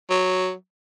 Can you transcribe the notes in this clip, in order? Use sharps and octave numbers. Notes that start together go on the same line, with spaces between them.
F#3